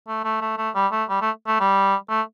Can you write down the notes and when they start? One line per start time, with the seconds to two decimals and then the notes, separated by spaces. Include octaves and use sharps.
0.08 A3
0.24 A3
0.41 A3
0.58 A3
0.75 G3
0.92 A3
1.09 G3
1.21 A3
1.47 A3
1.60 G3
2.10 A3